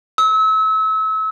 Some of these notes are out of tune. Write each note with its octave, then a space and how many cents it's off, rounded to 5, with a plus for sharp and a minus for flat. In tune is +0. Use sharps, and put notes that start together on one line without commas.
E6 -30